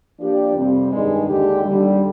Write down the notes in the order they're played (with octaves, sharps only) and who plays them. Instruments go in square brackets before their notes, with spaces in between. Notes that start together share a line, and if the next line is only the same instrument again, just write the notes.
[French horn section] F3 A#3 D4 G4 D5
F2 C3 G3 C4
G2 D#3 G#3 D4 G#4
D#2 D3 G#3 D4 G4
D#2 D3 G3